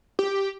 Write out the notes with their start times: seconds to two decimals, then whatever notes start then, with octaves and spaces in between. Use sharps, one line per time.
0.19 G4